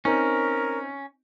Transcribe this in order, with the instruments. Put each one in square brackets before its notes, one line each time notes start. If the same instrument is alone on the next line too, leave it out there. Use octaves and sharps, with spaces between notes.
[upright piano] C4 D#4 [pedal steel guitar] C#4 [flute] A#4